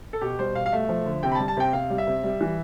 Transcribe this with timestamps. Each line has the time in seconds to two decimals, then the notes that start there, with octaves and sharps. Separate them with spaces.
0.13 A4
0.21 B2 G4
0.39 G3 C5
0.55 B2 F5
0.66 F5
0.72 A3 E5
0.89 F3
1.06 D3
1.23 C3 G5
1.32 B5
1.35 A5
1.39 G3
1.48 A5
1.57 C3 G5
1.73 C3 F5
1.90 G3
1.98 E5
2.07 C3
2.23 G3
2.41 E3